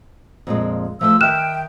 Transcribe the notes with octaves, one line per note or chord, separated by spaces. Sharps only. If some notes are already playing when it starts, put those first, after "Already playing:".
F2 A#2 G#3
F3 A3 C5 E6
D#3 E5 G5 F6 F#6 E7